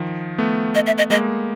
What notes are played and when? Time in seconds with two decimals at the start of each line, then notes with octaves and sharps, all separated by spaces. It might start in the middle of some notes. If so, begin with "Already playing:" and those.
Already playing: D#3 F3
0.38 A3 B3
0.75 D#5
0.86 E5
0.98 D#5
1.10 G#3 A#3 D#5